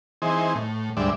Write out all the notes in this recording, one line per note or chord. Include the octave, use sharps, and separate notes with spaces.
E3 C4 D#4 G#4
A2
D2 G#2 G3 D5 E5